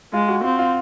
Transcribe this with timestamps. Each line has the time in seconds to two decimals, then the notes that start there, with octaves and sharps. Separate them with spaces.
0.13 G#3 F4
0.28 F#4
0.44 C4 F4
0.59 F4